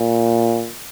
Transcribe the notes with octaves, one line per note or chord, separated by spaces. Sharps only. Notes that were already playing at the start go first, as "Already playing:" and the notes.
Already playing: A#2